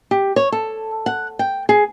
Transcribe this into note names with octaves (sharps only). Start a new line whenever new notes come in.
G4
C#5
A4
F#5
G5
G#4